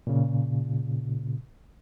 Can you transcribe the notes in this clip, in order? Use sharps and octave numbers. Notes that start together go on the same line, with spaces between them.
A#2 C#3